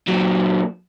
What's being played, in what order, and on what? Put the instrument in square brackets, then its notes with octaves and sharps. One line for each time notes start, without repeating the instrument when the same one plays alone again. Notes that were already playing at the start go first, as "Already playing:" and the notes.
[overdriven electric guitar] A#2 F#3